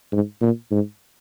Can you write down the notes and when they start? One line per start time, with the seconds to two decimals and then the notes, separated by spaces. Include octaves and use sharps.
0.12 G#2
0.41 A#2
0.71 G#2